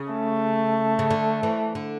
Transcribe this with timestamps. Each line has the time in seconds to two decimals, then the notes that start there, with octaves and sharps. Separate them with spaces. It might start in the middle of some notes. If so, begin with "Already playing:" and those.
Already playing: C#3
0.12 A3
0.99 C#3
1.10 D3
1.43 E3
1.75 D3